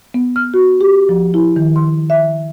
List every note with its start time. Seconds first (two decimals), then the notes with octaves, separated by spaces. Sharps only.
0.14 B3
0.36 F6
0.54 F#4
0.81 G4
1.09 F3
1.34 E4
1.56 D#3
1.76 C6
2.10 E5